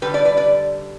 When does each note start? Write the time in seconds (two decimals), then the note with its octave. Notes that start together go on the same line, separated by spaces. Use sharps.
0.02 D3 G3 G4 B4
0.14 B4 D5
0.25 B4 D5
0.37 B4 D5